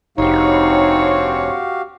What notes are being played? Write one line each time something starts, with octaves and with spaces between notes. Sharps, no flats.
F1 G2 C4 D#4 F#4 G4 C#5 F5